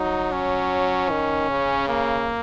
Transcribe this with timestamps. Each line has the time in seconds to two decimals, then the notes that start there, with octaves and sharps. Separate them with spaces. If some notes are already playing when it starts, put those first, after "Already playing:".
Already playing: F#3 D#4
0.32 C#4
1.11 D#3
1.50 C#3
1.89 A#3